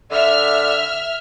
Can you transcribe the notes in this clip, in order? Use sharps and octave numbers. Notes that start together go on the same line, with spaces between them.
D3 E5 F6